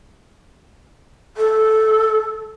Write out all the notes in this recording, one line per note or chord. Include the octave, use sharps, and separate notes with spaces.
A4